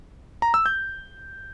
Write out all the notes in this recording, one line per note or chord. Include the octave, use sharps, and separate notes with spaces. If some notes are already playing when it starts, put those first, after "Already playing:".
A#5
E6
G6